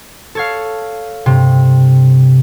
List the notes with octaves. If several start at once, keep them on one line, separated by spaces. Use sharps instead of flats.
A4 C#5 F5
G2 C3